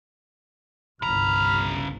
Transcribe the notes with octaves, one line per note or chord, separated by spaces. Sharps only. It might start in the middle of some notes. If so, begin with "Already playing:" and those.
G1 C2 C#3 A#5 B5 F6